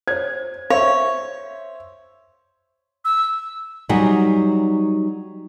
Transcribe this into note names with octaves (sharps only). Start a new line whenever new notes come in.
C5 C#5 G#6
C5 C#5 E5 F5
E6
F#3 G3 D#4 G#4 F#5